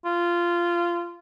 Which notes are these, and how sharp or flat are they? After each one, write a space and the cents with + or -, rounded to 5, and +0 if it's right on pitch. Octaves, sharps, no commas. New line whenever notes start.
F4 -15